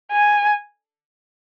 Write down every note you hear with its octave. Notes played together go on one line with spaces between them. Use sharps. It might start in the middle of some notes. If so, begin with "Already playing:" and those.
G#5